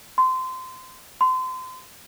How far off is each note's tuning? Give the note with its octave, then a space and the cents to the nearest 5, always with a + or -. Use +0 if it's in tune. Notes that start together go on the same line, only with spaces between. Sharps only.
C6 -25
C6 -35